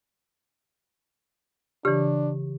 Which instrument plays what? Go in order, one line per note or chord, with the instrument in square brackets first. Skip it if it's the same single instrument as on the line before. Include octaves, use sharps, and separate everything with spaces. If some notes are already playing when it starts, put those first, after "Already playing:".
[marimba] C#3 E3 [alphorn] D4 [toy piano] G4